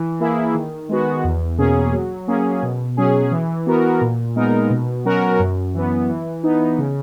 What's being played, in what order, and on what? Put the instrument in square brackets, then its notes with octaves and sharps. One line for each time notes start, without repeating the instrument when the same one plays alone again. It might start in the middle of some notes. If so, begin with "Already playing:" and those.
Already playing: [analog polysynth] E3
A#3 E4 G#4
D#3
G#3 B3 F#4
E2
B2 A#3 C#4 G#4
F#3
A#3 C#4 G#4
B2
F#3 C#4 G#4
E3
B3 F#4 A#4
A#2
G#3 B3 D#4 A#4
B2
F#3 C#4 F#4 A#4
F#2
E3 B3
E3
B3 D#4
C#3